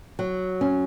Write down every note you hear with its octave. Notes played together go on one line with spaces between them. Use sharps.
F#3
C#4